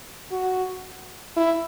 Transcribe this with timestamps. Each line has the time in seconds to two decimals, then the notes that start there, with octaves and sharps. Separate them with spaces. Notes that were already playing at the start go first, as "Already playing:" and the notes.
0.32 F#4
1.36 E4